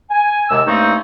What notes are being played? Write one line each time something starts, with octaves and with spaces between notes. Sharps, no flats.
G#5
D#2 C3 G#3 E6
G2 A3 A#3 C4 C#4 D#4